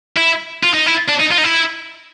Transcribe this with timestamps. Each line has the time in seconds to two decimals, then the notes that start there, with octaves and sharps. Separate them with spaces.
0.17 E4
0.63 F4
0.74 D#4
0.86 E4
1.08 D4
1.20 D#4
1.31 F4
1.38 D#4
1.44 E4